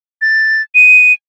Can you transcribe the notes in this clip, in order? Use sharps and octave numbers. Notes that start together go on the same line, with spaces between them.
A6
D#7